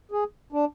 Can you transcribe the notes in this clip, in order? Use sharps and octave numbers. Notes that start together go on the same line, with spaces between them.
G#4
D4